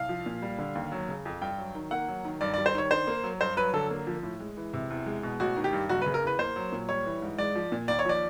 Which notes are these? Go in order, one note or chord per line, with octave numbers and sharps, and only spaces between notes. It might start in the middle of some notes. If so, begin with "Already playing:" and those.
Already playing: C2 F5
F3
A#2
G3
D3
D#2
F#3
C#3
F2
G2 G5
F#3
D#3
A#3 F#5
F#3
D#3
G2 D5
D5
G3
C5
D#3 C#5
D4 C5
A#3
F#3
G2 C5
F#3 B4
D3 A4
A#3
F3
A2
G#3
E3
C3
E2
G#3
B2
A1 F#4
D#3
G4
G2
F#1 F#4
B4
C#3
A#4
E2 B4
A#3 C5
F#3
A#2
G3 C#5
E3
G#2
G#3 D5
F3
A#2
D#2 D5
C#5
F3 D5